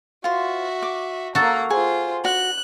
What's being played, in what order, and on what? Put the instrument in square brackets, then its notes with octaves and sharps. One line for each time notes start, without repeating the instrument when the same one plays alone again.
[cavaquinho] F4 C5 [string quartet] F#4 E5
[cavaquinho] D6
[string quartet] A#3 A#5 [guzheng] F#4 A4
[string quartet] F4 C5 [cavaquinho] G#4
[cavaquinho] F#4 [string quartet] F#6